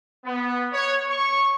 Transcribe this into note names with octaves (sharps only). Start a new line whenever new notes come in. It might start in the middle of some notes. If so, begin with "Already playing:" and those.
B3
C#5
C#6